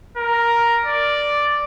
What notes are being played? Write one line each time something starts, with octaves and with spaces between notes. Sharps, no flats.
A#4
D5